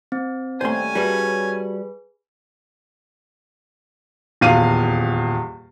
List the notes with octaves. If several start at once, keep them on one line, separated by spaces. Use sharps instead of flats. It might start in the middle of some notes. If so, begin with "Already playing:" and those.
C4
D#2 G3 A3 C#4 C5 G#5 C6
G3 F#4 G#4 B4 E5 A5
D#1 E2 F5 D#7